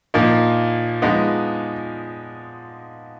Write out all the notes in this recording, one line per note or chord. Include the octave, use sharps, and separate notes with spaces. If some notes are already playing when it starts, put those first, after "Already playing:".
A#2 F3 A#3 D#4
F3 G#3 B3 D#4